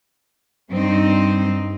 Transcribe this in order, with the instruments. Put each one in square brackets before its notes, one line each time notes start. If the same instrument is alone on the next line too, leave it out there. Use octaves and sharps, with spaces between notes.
[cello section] G2 C4 D#4